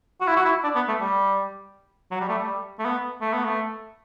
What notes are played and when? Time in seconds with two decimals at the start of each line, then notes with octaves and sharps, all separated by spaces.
0.21 F#4
0.27 E4
0.36 F#4
0.45 E4
0.64 D4
0.75 B3
0.88 A3
1.00 G3
2.11 F#3
2.20 G3
2.29 A3
2.38 G3
2.79 A3
2.85 B3
3.21 A3
3.33 B3
3.44 A3